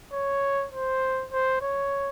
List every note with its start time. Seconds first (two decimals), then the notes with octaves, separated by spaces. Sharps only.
0.13 C#5
0.72 C5
1.32 C5
1.61 C#5